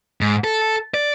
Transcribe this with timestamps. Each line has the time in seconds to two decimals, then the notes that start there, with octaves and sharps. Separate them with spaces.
0.21 G#2
0.44 A4
0.94 D5